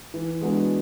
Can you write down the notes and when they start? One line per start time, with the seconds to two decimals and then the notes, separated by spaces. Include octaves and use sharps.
0.14 E3
0.41 G#3 B3 D4 F#4